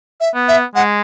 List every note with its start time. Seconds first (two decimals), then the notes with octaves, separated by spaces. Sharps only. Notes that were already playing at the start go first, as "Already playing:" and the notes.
0.20 E5
0.35 B3
0.48 E5
0.75 G#3 F#5